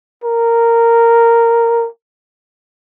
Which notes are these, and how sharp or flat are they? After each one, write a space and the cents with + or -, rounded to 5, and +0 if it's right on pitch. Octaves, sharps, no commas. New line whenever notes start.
A#4 -10